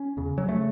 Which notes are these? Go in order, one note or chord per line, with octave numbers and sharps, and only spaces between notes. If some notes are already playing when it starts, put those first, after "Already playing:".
Already playing: C#4
E2 C#3
F#3
C#3 A3